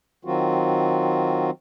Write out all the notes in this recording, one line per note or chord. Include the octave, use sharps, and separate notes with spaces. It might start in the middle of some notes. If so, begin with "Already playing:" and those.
D#3 F#3 C4 F4 F#4